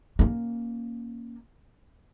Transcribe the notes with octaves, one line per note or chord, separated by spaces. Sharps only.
A#3 C#4